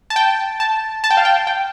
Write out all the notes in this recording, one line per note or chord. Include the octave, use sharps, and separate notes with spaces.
A5
G5
A5
A5
G5
F5
G5
G5